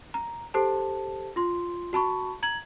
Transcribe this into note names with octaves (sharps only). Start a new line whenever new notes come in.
A#5
G4 A4 C5 A5
F4 C6
F#4 A5 B5 C#6
A#5 G#6 F#7